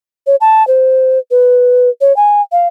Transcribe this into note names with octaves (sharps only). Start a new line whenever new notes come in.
C#5
A5
C5
B4
C#5
G#5
F5